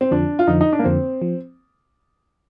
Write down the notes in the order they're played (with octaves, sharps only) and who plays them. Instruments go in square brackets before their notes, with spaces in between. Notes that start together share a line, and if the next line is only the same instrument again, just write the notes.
[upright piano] C4
[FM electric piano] F2 D3 F3 [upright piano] D4
[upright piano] F4
[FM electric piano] F2 D3 F3 [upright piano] D#4
[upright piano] D#4
D4
A#3
[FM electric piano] F2 D3 F3 [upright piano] C4
[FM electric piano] F3